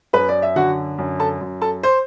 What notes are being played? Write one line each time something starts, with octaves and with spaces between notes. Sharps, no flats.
F#2 B4 B5
D5
E5
D3 F#4 F#5
F#2
A4 A5
F#2
A4 A5
C5 C6